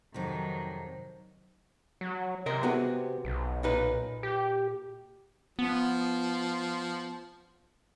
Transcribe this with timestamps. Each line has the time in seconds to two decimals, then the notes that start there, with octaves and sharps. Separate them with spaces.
0.14 F2 C3 D#3 F#3
2.01 F#3
2.46 C3 A#4 C5 D#5
2.63 B3 F#4 G#4
3.25 B1
3.63 A#2 D#4 B4
4.23 G4
5.59 F3 B3